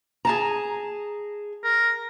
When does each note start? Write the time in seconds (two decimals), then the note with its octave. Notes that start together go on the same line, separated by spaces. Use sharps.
0.25 G#4 A5 A#5
1.64 A#4